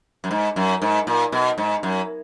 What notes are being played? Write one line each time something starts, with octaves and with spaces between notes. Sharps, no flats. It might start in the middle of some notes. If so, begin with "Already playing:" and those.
F#2
G#2
F#2
G#2
A#2
B2
G#2
F#2